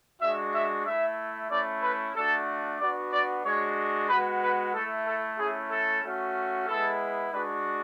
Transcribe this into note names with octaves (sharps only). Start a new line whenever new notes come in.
G#3 D4 F#4 E5
E5
A3 E4 E5
A3 C#4 E4 D5
B4
A3 D4 F#4 A4
B3 D4 F#4 D5
D5
G#3 D4 F#4 C#5
G#3 B3 F#4 B4
B4
A3 E4 A4
A4
A3 C#4 E4 G#4
A4
A3 C#4 F#4
G#3 B3 E4 A4
G#3 D4 F#4 B4